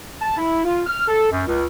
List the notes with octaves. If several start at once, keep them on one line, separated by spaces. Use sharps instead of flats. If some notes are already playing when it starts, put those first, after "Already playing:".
A5
E4
F4
F6
A4
F#2
C#2